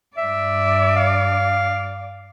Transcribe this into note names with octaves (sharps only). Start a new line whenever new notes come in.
G2 D5 E5
F5